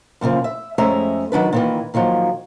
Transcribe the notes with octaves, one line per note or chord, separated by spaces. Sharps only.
F#2 A#2 C#3 F3
E5
F2 G#3 A3 C#4 E5 A#5
D#3 F#3 D4 B4
A#2 D#3 E3
A#2 D#3 F3 F#3